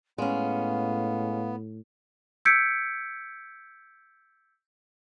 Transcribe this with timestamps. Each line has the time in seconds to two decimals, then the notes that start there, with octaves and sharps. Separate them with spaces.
0.18 A2 G#3 B3 C#4 F5
2.45 E6 G6 G#6 B6 C#7 D7